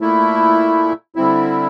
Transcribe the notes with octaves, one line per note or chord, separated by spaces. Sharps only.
A#2 A3 E4
D3 G3 C4 E4